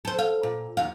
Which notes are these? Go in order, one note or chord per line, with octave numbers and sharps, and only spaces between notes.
A4 C5
F5
A#2
D#2 F5